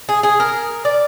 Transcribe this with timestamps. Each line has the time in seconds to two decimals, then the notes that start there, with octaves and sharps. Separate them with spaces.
0.09 G#4
0.23 G#4
0.40 A#4
0.85 D5